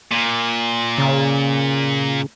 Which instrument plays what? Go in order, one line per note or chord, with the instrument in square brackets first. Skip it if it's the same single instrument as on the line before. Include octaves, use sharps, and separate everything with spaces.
[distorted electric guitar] A#2
[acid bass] C#3